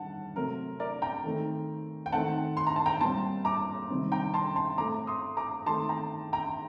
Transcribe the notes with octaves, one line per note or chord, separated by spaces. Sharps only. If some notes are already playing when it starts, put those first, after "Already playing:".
Already playing: D#3 G3 F#5 A5
C3 F#3 A3 C4 A#4
A#4 D5
G5 A#5
D#3 A3 C4
G5
D#3 A3 C4 F#5 A5
C6
A#5
A5
G5 A#5
A#2 G3 C4 A5 C6
A#5 D6
C3 D#3 G3 C4
G5 A#5
A5 C6
A5 C6
A2 A3 C4 A#5 D6
C6 D#6
A#5 D6
D#3 A3 C4 A5 C6
G5 A#5
G5 A#5